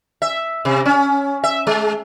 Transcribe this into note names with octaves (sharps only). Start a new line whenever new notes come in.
E5
C3
C#4
E5
G#3